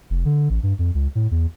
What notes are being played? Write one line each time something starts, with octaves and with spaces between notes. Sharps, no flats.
F1
D3
A1
G2
F2
C#2
A2
E2